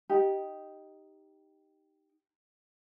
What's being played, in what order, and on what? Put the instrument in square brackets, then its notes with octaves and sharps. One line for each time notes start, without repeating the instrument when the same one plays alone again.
[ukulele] D#4 G4